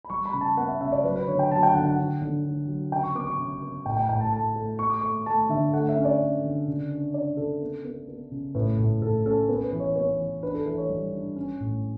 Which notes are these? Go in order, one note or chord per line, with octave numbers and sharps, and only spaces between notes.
B5
G3 C#6
B5
C#3
A5
B3 F#5
E5
C#3 E5
D5
F#3 B4
B4
D3 C#5
G5
F#3 A5
G5
D3 F#5
F#5
D3
D3
D3
F#3
C#3 G5
C#6
B3 D6
C#6
C#3
B3
A2 G5
G5
A2 G5
A5
A3 A5
A3
A3 C#6
D6
A3 C#6
A3 A5
D3 E5
A3 F#5
E5
C#4
D5
C#4
D3
C#3
D4
D4 D5
C#3 A4
B3
B3
B3
C#3
A2 B4
A2
A2 A4
C#4 A4
B3
B4
E3
C#5
B3 C#5
E3
D4 B4
A4
E3 A4
C#5
G3
D4
C#4
A2